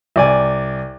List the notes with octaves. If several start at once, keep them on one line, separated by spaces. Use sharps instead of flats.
C2 D5 G#5